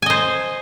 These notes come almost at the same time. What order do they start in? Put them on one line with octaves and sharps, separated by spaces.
G#5 D#5 C5